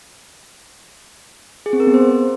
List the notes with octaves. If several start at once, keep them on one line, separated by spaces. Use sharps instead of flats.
G#4
C4
A#4
B3
C5